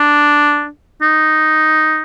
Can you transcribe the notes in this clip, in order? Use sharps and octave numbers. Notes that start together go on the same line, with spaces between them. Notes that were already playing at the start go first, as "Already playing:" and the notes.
Already playing: D4
D#4